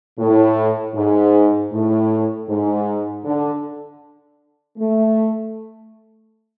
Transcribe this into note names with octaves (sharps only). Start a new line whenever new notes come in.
A2
G#2
A2
G#2
D3
A3